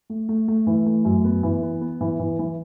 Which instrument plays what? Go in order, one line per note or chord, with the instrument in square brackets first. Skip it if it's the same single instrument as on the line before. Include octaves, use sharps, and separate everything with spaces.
[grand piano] A3
A3
A3
E3
A3
F#2
B3
E3
B3
B3
E3
E3
E3